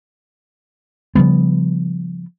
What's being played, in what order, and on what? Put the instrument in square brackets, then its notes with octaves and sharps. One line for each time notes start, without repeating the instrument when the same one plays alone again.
[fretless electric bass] C#3 F3 G3 B3